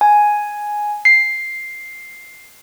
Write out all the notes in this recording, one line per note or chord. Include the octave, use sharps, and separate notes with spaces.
G#5
C7